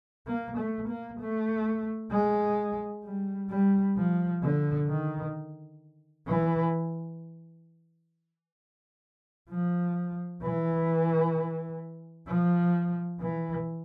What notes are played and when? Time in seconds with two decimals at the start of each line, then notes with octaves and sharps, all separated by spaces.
0.27 A#3
0.58 A3
0.89 A#3
1.20 A3
2.12 G#3
3.04 G3
3.50 G3
3.97 F3
4.43 D3
4.89 D#3
6.28 E3
9.50 F3
10.43 E3
12.27 F3
13.20 E3